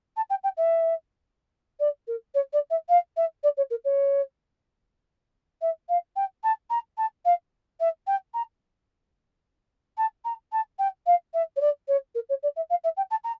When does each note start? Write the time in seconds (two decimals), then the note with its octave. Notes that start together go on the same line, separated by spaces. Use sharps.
0.16 A5
0.30 G5
0.43 G5
0.57 E5
1.79 D5
2.07 A#4
2.34 C#5
2.53 D5
2.70 E5
2.89 F5
3.16 E5
3.43 D5
3.57 C#5
3.70 A#4
3.84 C#5
5.61 E5
5.89 F5
6.16 G5
6.43 A5
6.70 A#5
6.97 A5
7.25 F5
7.80 E5
8.07 G5
8.34 A#5
9.97 A5
10.24 A#5
10.52 A5
10.78 G5
11.06 F5
11.34 E5
11.56 C#5
11.61 D5
11.88 C#5
12.15 A#4
12.29 C#5
12.43 D5
12.56 E5
12.70 F5
12.84 E5
12.97 G5
13.10 A5
13.24 A#5